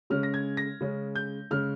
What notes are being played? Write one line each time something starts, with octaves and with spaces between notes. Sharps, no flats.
C#3 G#3 C#4 F6
A#6
G#6
A#6
C#3 G#3 C#4
G6
C#3 G#3 C#4 F6